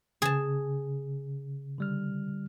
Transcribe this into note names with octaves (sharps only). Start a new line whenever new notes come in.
C#3 G#4 A5
D3 G3 F6